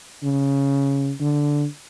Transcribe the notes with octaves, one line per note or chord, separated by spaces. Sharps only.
C#3
D3